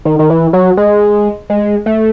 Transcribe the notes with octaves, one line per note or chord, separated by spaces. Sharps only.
D#3
D#3
E3
F#3
G#3
G#3
A3